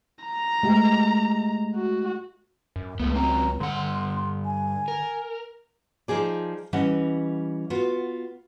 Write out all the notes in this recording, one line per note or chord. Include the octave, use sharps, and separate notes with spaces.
A#5
G#3 A3 G4
F#4
F#2
C#2 G#3 A3 B3
F#3 C4 C#4 A#5
G2 D3 F#5 C6
G#5
A#4
F3 D#4 G#4 D5
E3 G3 C#4 D#5 F#5
B3 F4 F#4